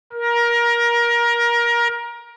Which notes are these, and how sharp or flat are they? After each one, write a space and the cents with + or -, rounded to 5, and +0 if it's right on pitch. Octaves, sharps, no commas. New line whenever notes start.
A#4 +20